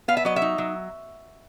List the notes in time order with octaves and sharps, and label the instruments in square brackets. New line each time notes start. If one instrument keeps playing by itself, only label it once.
[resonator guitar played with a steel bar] B3 F5
E5
F#3 D#5
E5
D#4
F#3